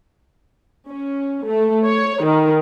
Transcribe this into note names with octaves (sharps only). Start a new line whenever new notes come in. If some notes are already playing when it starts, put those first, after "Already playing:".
C#4
A3
C#5
D#3